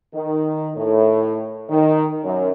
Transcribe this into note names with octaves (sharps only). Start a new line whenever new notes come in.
D#3
A2
D#3
F#2